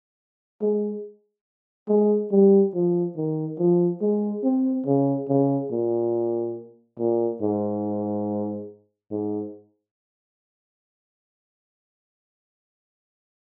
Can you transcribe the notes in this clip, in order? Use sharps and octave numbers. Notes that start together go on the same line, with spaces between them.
G#3
G#3
G3
F3
D#3
F3
G#3
C4
C#3
C#3
A#2
A#2
G#2
G#2